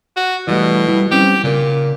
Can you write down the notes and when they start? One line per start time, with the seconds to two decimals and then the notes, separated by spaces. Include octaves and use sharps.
0.17 F#4
0.47 B2 E3 G3 A3
0.88 G3 E4
1.11 G3 C4 C#4 G4
1.44 A#2 C#3 A#4